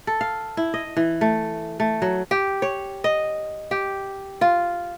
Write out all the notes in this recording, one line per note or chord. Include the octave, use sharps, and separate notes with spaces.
A4
F5
E4
D#5
E3
A3
A3
F#3
G4
C#5
D#5
G4
F4